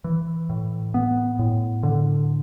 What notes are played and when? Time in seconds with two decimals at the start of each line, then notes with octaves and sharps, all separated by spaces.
0.04 E3
0.49 A2
0.94 B3
1.39 A2
1.83 D3